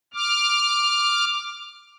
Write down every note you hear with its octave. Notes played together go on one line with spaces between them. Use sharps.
D6 F6